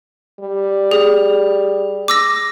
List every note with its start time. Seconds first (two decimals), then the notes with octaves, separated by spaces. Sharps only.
0.40 G3
0.91 G#4
2.08 D6 E6 A#6